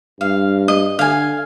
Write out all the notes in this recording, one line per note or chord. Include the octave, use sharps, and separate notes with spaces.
G2 F5
D#5
D3 F5 G#5